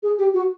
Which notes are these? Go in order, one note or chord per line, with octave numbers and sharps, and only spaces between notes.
G#4
G4
F#4